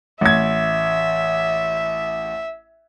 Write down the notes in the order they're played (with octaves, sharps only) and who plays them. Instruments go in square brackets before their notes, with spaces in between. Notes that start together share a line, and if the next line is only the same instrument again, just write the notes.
[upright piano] A1 G#6 [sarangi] E5